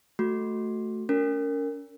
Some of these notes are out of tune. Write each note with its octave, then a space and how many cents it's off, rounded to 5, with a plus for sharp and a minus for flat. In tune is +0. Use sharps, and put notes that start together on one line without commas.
A3 +0 F#4 -5
C#4 +35 A#4 -15